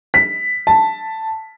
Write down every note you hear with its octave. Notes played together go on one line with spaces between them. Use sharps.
B6
A5